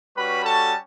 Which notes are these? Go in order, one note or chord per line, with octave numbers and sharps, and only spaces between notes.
G3 C#4 F#4 B4 B5
A4 A5